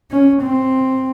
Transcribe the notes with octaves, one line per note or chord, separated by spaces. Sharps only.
C#4
C4